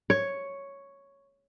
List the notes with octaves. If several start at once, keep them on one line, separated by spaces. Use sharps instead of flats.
C#5